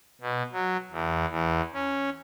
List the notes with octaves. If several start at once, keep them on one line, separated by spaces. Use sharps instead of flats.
B2
F#3
E2
E2
C#4